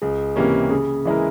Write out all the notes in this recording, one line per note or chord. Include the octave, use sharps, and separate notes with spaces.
C#2 G#4
C3 E3 A#3 C#4 G4
C#3 G#4
E3 G#3 E4 A#4